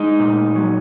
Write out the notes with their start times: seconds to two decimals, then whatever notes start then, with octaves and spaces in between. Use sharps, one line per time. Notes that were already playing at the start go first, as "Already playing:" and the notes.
Already playing: G#3 D#4
0.20 A#2
0.56 F#3